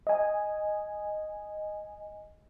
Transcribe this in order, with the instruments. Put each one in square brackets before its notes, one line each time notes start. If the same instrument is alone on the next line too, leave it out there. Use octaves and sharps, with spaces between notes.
[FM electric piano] D#5 G#5